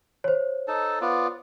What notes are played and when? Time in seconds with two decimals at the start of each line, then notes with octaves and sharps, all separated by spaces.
0.24 C5 C#5
0.68 D#4 A4 A5
1.01 B3 F4 D5